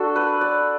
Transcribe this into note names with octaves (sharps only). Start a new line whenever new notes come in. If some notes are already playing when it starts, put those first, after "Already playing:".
Already playing: D4 F#4 A4
B4
D5